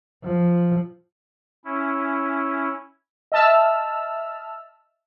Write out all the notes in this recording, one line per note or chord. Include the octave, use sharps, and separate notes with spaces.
F3
C#4 E4
D#5 E5 A5 E6 F6